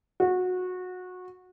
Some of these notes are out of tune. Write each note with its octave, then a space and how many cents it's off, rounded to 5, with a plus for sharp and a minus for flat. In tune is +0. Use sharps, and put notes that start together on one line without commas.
F#4 -20